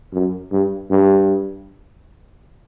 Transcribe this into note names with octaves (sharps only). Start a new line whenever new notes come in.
F#2
G2
G2